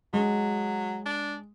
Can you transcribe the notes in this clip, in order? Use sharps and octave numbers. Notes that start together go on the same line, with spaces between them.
F#3 G#3
D4